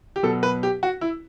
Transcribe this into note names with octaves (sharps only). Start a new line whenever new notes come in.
G4
B2 F#3 A4
B4
G4
F#4
E4